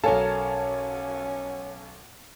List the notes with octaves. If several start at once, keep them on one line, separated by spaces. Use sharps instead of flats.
B1 C#4 A4 A#4 C#5 F5 G#5 A5